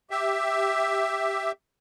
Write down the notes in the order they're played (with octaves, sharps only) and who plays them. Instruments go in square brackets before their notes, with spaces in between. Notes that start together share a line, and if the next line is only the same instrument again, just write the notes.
[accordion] G4 E5